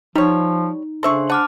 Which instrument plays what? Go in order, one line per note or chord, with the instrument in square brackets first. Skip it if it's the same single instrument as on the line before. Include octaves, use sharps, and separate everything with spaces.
[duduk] F3 [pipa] G3 C#5 [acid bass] D#4
[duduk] C#3 [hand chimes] D4 C5 C6 [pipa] A4 E5 C#6
[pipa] F#5 [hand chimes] A5 D6 F6